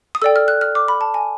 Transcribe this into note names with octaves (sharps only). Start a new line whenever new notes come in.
D#6
A4 D5 G5 E6
F6
F#6
F6
D6
B5
A5
G#5